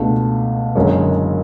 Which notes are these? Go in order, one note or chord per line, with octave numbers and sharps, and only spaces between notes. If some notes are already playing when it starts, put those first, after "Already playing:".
Already playing: C#2 B2 A3 D4
F#1 F#2 D3 G#3 C#4